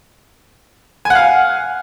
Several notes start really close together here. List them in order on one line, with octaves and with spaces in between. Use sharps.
G#5 F#5 F5